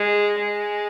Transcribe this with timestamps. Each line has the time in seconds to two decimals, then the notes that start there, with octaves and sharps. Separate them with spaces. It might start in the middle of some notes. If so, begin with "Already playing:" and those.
Already playing: G#3
0.38 G#3